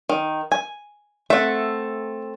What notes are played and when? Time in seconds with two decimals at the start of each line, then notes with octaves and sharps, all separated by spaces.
0.09 D#3
0.52 G#5
1.30 A3 C4 E5 F#5